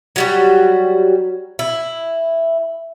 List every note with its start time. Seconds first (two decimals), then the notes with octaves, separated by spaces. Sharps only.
0.16 F#3 G3 F#4
1.59 E4